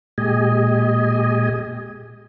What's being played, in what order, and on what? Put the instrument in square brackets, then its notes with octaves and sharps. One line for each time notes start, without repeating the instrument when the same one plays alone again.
[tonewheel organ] A#2 G#3 G4 D#5 G#5